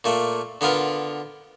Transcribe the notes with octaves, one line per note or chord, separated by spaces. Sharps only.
A#2 A3 A#3
D3 B3 F4 A#4 B4